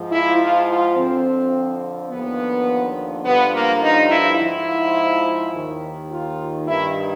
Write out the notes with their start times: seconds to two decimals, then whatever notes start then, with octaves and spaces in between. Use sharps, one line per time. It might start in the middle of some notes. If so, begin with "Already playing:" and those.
Already playing: G#2 F3
0.12 E4
0.40 F4
0.69 F4
0.97 F2 D3 F3 C4
2.10 D#2 D3 F3 B3
3.24 G2 D3 F3 B3
3.53 A#3
3.82 D#4
4.10 E4
4.39 G#2 F3 E4
5.53 D#2 D#3
6.10 F4
6.67 G2 D#3 E4